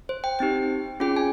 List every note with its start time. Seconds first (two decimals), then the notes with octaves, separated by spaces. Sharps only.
0.09 C5
0.24 G5
0.39 C4 D#4 G4 G5
1.00 C#4 F4 G#4 G5
1.16 G#5